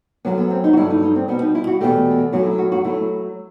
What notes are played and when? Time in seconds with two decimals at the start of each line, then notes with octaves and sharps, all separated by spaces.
0.25 F#2 F#3 A3 B3
0.38 B3
0.50 C4
0.64 D#4
0.73 F#4
0.77 G2 F#3 A3 E4
0.90 D#4
1.03 D#4
1.16 C4
1.28 B2 G3 B3
1.42 D#4
1.55 E4
1.67 F#4
1.80 E2 B2 A3 G4
2.32 F#2 F#3 A3 F#4
2.46 E4
2.58 F#4
2.72 F#4
2.84 F#3 A3 E4